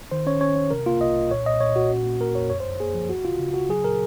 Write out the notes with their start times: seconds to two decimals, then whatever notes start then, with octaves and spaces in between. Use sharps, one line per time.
0.11 D#3 C5
0.26 C#4 C#5
0.41 C#4 C#5
0.56 C#4
0.70 C3 A#4
0.86 A#3 F4
1.00 C2 D#5
1.16 C2
1.31 A#2 C#5
1.45 A#2 D#5
1.61 A#2 C#5
1.76 A#2 F#4
1.90 C#4
2.05 A#3
2.20 A#3 A#4
2.35 F2 C#5
2.50 F#2 C#5
2.60 C5
2.65 F#2
2.80 A#3 G#4
2.94 F3
3.09 C#2 F#4
3.25 C#3 F4
3.40 C#3
3.54 C#3 F#4
3.69 F#3 G#4
3.84 A#2 A#4